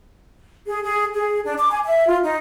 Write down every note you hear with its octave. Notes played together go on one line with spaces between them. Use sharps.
G#4
G#4
G#4
D4
D6
G#5
E5
F4
D#4